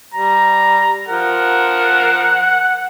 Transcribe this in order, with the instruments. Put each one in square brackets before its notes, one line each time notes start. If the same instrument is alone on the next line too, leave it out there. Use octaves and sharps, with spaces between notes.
[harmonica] G3 [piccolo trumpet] A#5
[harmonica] F3 A#4 [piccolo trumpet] F#5